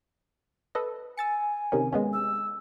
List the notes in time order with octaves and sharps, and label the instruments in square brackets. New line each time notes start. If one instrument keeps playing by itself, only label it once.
[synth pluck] A4 B4 D#5
[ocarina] G#5 [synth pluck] E6 A6 C#7
[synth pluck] C3 D#3 C#4
G#3 B3 C#4
[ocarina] E6